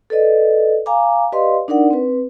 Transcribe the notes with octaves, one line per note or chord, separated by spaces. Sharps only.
A4 B4 D5 D#5
F5 G#5 A#5 D6
G4 B4 D5 D#5 F5 C6
D4 D#4 A#4 D5 F#5
C4 B4